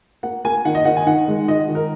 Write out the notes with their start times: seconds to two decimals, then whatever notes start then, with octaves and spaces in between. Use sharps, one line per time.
0.23 A#3 F#5
0.45 A#3 G#5
0.65 D#3 F#5
0.75 D#5
0.85 D#3 F#5
0.96 G#5
1.06 D#3 F#5
1.28 G#3
1.48 D#3 D#5
1.68 D#3
1.75 A#4